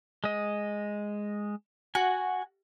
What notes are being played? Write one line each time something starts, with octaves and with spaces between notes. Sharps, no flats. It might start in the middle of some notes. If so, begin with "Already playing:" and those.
G#3 D#5
F#4 G#5